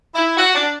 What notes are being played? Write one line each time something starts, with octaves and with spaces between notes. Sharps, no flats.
E4
F#4
D4